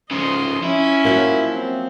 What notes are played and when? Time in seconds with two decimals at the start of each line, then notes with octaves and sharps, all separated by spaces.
0.11 C#3 F3 D#5 C6
0.64 C#4 E4
1.05 F3 F#3 A#3
1.54 C4